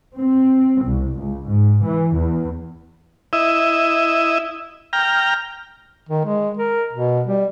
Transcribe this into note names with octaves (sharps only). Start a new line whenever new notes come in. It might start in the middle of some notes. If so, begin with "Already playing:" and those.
C4
C2
C#2
G#2
E3
E2
E4 D#5 E5
G5 A#5 F6
D#3
G#3
A#4
B2
G3